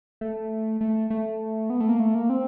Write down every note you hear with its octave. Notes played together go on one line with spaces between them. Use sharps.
A3
A3
A3
B3
A3
A#3
A3
A#3
C4